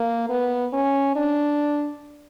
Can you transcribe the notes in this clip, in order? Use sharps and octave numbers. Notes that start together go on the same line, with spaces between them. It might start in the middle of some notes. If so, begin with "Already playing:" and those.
Already playing: A#3
B3
C#4
D4